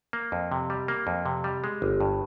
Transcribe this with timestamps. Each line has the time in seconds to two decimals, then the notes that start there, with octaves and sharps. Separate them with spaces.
0.13 A#3
0.32 F2
0.52 C3
0.70 G3
0.88 A#3
1.07 F2
1.26 C3
1.44 G3
1.64 G#3
1.82 G1
2.01 G2